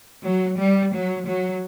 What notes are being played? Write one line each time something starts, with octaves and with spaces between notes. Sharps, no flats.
F#3
G3
F#3
F#3